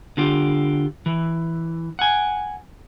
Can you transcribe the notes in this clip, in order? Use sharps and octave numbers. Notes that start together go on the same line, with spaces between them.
D3 F4 G4
E3
F#5 G#5